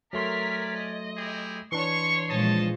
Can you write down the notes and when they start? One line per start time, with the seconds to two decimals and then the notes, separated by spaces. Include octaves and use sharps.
0.13 F#3 A3 A#4 D5 G#5 C6 F6 B6
0.75 D#5
1.17 E4 G4 G#4
1.72 E3 D4 C#5 C6 C#6
2.29 A#2 F3 G#3 D#5 A5